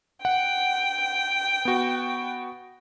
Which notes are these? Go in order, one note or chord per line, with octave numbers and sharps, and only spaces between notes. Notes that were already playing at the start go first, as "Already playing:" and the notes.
F#5 G5
B3 F#4